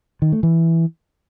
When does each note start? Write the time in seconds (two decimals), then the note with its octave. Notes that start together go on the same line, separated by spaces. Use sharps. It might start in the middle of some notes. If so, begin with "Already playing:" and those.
0.22 D#3
0.32 A3
0.43 E3